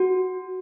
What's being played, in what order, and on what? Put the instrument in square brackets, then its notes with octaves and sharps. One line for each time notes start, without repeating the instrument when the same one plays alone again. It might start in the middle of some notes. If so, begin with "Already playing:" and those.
Already playing: [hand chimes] F#4